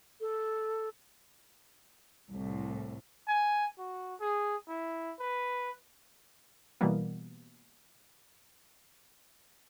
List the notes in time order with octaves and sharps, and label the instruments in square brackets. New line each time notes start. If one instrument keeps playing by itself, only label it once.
[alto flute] A4
[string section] C2 A2
[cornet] G#5
F#4
G#4
E4
B4
[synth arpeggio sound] B2 E3 G3 A#3 B3